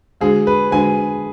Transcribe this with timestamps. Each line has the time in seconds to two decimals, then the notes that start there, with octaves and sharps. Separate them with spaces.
0.21 D3 G#3 D4 F#4 G#4
0.47 B4
0.71 D3 G#3 D4 F#4 G#5